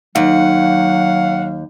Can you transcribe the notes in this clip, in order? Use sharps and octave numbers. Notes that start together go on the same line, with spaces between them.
D#2 F#3 F5 F#5